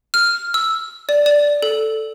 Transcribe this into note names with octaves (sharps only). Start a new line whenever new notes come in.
F6
E6
D5
D5
A4